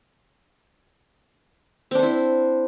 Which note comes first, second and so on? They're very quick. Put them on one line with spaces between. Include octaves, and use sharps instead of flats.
C4 D4 C5 E4